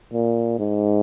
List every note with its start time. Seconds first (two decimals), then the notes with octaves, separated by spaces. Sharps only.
0.13 A#2
0.59 G#2